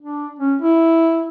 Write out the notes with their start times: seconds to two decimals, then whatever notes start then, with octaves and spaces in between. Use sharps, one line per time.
0.02 D4
0.39 C#4
0.62 E4